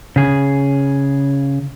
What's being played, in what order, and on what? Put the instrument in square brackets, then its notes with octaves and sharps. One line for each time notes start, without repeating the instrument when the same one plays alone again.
[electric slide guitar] C#3 G#4